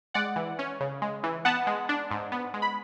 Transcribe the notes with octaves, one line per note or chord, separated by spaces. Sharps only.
G#3 D5 F#5
E3
C#4
C#3
G#3
E3
B3 F#5 A5
G#3
D4
G#2
B3
G#3
B5